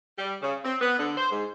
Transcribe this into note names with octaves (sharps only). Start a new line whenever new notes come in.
G3
C#3
C4
B3
D3
C5
G#2